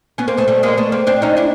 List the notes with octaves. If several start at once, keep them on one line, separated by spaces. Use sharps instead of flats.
B3 C#4
A#3 C4
A3 B3
G3 A3
G#3 A#3
A3 B3
A#3 C4
C4 D4
C#4 D#4
D4 E4